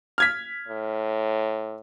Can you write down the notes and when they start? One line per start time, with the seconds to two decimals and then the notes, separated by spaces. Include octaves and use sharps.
0.18 F6 G#6 B6
0.68 A2